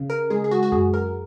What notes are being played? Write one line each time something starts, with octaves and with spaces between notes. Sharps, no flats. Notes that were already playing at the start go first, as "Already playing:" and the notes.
Already playing: C#3
A#4
G#3 G#4
G#4
F#4
F#4
F#2 G#4
A#4